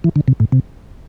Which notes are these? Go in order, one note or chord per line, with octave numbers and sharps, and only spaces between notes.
E3
D3
C3
A2
C3